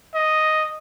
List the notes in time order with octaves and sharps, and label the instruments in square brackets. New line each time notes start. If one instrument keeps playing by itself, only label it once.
[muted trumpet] D#5